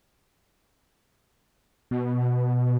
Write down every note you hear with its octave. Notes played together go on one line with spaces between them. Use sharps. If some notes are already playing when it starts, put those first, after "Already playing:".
B2